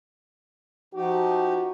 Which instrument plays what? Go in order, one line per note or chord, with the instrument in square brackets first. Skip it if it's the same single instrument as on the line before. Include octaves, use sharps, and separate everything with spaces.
[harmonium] F3 D#4 G4 [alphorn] F#4